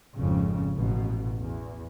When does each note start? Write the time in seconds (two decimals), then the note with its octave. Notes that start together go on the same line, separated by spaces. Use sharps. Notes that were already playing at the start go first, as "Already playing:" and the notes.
0.16 G#1 F2 C#3
0.75 A1 B2
1.39 E2